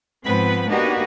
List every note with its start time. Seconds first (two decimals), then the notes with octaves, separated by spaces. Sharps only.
0.25 G#2 F3 B3 C4 B4 B5
0.67 A#3 B3 D4 D#4 F#4 G4